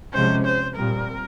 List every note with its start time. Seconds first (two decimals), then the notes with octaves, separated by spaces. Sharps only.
0.14 C3 F3 G#3 C#4 C5
0.45 C5
0.76 A#2 G3 C4 A#4